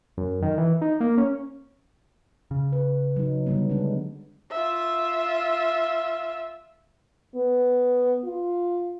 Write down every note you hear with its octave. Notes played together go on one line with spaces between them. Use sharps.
F#2
D#3
E3
D#4
A#3
C#4
C#3
B4
F#3 D#4
D3 G3 B3
G#3 D4
F4 E5
B3
F4